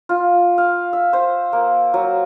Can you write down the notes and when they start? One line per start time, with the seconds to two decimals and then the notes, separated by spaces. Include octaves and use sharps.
0.09 F4
0.58 F5
0.93 E5
1.13 C5
1.53 A#3
1.94 F#3